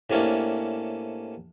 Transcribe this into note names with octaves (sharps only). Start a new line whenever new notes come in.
A2 C3 A#3 C#4 D4 E4